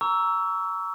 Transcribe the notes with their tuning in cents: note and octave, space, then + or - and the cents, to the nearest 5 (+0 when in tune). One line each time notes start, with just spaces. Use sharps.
A#5 +0 C#6 +35 E6 +0